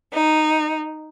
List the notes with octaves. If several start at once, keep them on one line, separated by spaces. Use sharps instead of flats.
D#4